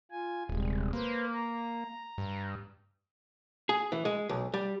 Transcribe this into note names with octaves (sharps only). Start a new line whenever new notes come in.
F4 G#5
D#1 C3 G3 G#3
A#3 B4 C5
A#5
G2
G#4
E3
G#3
B1
G3